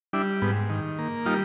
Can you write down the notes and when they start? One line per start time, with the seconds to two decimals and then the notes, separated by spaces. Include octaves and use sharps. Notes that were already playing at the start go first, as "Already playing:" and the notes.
0.13 G3 D4 E4
0.42 G#2 B3
0.70 D#3
0.99 A#3
1.26 G3 D#4 F4